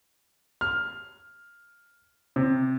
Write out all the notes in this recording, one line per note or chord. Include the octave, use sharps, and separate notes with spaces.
F6
C3